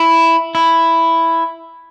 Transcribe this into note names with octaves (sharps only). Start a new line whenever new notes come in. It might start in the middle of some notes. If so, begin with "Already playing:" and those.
Already playing: E4
E4